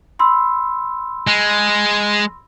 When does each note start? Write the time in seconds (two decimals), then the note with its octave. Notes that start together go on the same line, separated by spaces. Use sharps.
0.19 B5 C6 E6
1.27 G#3